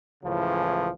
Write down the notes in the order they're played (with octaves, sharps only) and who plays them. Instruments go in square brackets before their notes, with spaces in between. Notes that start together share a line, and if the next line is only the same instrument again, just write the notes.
[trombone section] C#2 A2 C#3 E3 F3